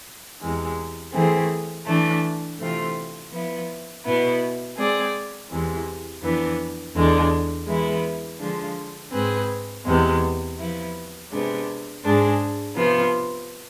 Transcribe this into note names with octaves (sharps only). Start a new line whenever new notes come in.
E2 C3 E3 G#3
E3 A3 C4 G#4
E3 A3 D4
C3 E3 A3 C4 F4
F3 B3 E4
B2 B3 E4
G#3 C4 G#4 D5
E2 C3 E3 G#3
F2 E3 B3 D4
E2 D3 G#3 D4
E3 G#3 B3 E4
D3 F3 G#3 D4 F4
G#2 G#3 C4 G#4 B4
E2 C3 G#3 B3
F3 B3 E4
C3 G#3 B3 D4
G#2 G#3 D4 G#4
C3 F3 B3 F4